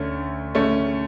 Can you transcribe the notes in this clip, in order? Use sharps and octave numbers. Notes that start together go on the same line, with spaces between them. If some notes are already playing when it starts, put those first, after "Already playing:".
Already playing: D2 D3 A3 C#4
A3 C#4